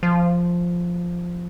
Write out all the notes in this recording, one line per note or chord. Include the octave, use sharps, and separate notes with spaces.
F3